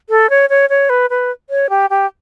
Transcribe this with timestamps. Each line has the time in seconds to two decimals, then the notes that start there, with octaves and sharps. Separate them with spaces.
0.10 A4
0.30 C#5
0.50 C#5
0.70 C#5
0.89 B4
1.10 B4
1.50 C#5
1.70 G4
1.90 G4